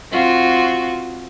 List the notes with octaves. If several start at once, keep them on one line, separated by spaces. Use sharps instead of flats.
C4 F4 F#4